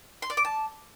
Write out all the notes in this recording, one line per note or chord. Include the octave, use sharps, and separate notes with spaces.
C6
D5
D6
A5